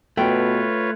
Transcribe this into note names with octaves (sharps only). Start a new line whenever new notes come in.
B2 A3 F4 B4 C#5 G5